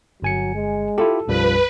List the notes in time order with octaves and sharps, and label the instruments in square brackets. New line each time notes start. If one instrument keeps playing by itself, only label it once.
[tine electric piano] G1 G#5 C#7 [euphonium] F#3
[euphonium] G#3
[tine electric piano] E4 F4 G4 [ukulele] A4
[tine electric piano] B1 F#2 G3 [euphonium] F3 [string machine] B4